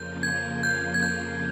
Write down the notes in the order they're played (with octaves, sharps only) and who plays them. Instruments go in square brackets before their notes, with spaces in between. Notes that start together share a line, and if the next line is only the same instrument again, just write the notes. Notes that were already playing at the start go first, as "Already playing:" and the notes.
Already playing: [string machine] F2 C#3 F3 A#3 F4 [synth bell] G6
[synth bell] G#6
G6
G#6
G6